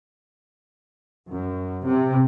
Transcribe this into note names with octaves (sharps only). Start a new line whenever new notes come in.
F#2
C3